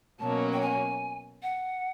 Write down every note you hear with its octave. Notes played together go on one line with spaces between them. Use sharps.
B2 F#3 A#3 C#4 A5
G5
G#5
F#5